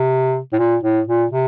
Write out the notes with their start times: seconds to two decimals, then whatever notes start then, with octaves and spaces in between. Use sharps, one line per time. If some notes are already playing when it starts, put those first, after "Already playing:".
Already playing: C3
0.53 A2
0.59 A#2
0.83 A2
1.08 A#2
1.31 C3